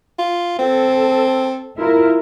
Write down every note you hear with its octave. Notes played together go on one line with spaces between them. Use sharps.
F4
C4 A4
E4 F4 A#4